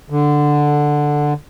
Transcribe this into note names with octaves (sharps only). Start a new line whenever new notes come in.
D3